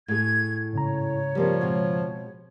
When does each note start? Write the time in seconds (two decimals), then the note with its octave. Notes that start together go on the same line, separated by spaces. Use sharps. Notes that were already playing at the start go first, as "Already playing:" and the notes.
0.08 A2 G#4 G#6
0.73 G#2 C#3 C#5 A#5
1.35 F3 G3 A#3 C4
1.61 B2 G#3 C4